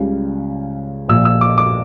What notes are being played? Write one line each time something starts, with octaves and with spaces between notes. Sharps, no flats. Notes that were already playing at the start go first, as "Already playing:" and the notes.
Already playing: C#2 C#3 G3
A#1 A#2 F3 E6
E6
D6
D6